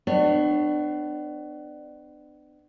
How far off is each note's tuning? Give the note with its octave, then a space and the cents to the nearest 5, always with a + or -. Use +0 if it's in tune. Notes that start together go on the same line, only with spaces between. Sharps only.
B3 +40 D4 +30 C#5 +0